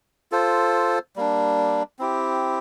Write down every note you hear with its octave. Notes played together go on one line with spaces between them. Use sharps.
F4 A4 C5
G3 A#3 D4
C4 E4 G4